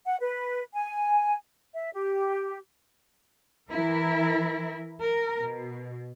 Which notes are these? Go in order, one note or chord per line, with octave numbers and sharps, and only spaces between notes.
F#5
B4
G#5
E5
G4
E3 E4 A#4
A#4
B2